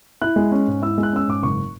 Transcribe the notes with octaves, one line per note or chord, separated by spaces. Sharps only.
E4 F#6
G#3
C#4
G#2
E4 E6
G#3
F#6
C#4 E6
G#2 D6
F#1 C#6